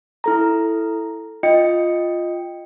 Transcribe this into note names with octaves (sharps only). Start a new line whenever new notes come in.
E4 A4 A#5
F4 D#5 G5 C#7